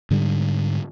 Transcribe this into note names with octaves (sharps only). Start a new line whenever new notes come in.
G#2 D3 G3